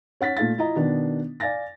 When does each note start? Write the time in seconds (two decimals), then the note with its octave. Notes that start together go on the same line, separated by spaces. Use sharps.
0.21 C#4 F#5 A6 B6
0.37 A#2 A3 F5 A6
0.58 E4 F4 D#5 A#5
0.75 B2 D#3 B3 D4
1.40 D5 F5 G#5 A6 A#6